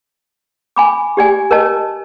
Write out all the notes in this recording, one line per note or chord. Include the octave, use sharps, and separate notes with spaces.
G#5 B5 D6
G4 D5 G#5
A#4 C#5 D#5 A5